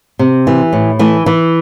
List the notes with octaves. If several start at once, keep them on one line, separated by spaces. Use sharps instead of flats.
C3
E3
A2
E3 A3
E3